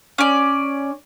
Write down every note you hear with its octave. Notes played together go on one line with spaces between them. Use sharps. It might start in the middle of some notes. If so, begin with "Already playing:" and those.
C#4 D5